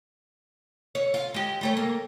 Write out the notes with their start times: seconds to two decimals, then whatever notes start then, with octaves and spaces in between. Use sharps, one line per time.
0.95 C#5
1.14 F4
1.34 G#3 G4
1.61 G3 A3 C#5
1.77 A#3